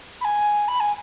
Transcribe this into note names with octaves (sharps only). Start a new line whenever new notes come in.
B5
G#5
B5
G#5